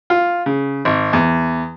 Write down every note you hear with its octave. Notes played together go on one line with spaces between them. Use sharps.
F4
C#3
G#1
E2